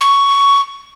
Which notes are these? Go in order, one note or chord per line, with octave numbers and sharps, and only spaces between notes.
C#6